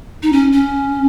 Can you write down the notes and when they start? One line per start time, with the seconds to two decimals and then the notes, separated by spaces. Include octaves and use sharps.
0.23 D#4
0.32 C#4
0.53 C#4